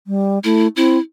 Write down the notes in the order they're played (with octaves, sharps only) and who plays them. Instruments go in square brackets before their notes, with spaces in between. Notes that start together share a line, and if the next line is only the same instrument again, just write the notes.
[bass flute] G3
[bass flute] A3 [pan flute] E4
[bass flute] C4 [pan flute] E4